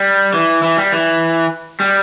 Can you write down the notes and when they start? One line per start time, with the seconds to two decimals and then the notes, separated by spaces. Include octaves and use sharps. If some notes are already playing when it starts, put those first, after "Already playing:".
Already playing: G3
0.34 E3
0.63 E3
0.77 G3
0.92 E3
1.80 G3